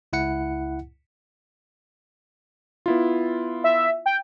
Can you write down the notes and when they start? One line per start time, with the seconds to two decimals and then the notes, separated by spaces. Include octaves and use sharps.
0.13 C#2 E4 F#5 C#7
2.86 B3 E4 F4
3.64 E5
4.06 G5